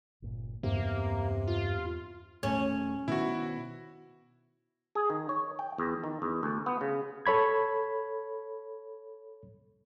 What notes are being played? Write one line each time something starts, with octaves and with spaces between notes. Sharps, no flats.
G1 C#2 A#2
E2 G2 C3 A#3 B3
F4
D#1 A3 C#4
B2 D#3 B3 E4 F#4
G#4
D#3
C#5
G5
E2
D#3
E2
D2
B3
C#3
A4 C#5 B5 G#6